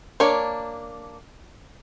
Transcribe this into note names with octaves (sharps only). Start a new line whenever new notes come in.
A#3 D4 C#5